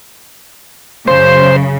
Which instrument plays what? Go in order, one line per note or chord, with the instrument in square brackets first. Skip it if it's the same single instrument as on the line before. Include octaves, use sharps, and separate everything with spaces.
[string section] F#2 C#3 [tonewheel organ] C5